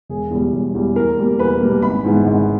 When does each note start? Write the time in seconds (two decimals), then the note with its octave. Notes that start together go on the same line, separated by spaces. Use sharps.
0.09 E1 G#4
0.31 E2 B2 G3
0.53 E1
0.74 E2 B2 G3
0.96 E2 A#4
1.17 B2 G3 A#3
1.39 E2 B4
1.61 B2 G3 A#3
1.82 G#1 B5
2.04 G#2 E3 G#3 B3
2.26 G#1